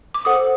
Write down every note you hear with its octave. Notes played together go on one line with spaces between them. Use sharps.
D6
A4 C5 F#5 D#6